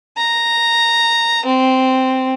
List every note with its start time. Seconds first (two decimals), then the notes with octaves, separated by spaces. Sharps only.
0.17 A#5
1.45 C4